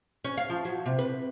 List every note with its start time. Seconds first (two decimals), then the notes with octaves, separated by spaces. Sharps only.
0.25 C#4
0.38 F5
0.50 F3
0.65 F#3
0.86 C3
0.99 B4